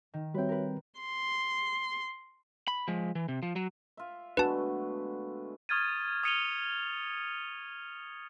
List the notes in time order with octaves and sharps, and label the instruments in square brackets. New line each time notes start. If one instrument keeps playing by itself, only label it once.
[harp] D#3
[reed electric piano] G3 C4 [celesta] F#4 C#5 E5 [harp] B4 G5
[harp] A#4 B4
[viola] C6
[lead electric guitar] B5
F3 G#3
E3
C3
F3
F#3
[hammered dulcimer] F4 E5
[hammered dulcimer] G#3 A3 B3 [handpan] D4 F#4 [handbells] B4 A5
[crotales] C#6 D#6 F6 G#6 A6 D#7
D#6 F6 C#7 D#7 F7 G7